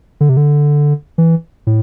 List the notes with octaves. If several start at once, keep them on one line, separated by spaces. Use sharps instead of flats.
D3
C3
D3
E3
A2